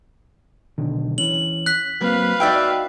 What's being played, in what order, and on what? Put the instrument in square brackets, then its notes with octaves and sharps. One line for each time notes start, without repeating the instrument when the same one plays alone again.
[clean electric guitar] B1 D3 D#3
[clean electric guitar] E3 C#4 [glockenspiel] F#7
[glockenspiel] F#6 B6
[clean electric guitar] F#3 A#3 C4 [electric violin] B4 F5
[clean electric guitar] D#4 F#4 [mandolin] D5 E5 G5